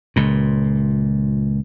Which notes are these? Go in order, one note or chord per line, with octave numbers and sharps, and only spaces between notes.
C#2 A#2